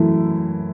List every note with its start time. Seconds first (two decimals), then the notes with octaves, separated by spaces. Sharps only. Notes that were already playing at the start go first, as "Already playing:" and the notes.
Already playing: F#2 E3 A3 E4